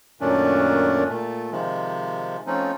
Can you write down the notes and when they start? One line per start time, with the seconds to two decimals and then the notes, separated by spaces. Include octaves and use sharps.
0.21 F#2 A#2 D#3 A3 C#4 D4
1.09 A#2 A3
1.52 C3 D#3 F3 G#3
2.47 F3 A3 C4 C#4 D#4